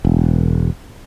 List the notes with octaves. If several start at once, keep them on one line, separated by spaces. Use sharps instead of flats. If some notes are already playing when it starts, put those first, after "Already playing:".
E1